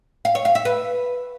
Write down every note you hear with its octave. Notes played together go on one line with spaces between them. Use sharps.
F5
C#5
F5
E5
B4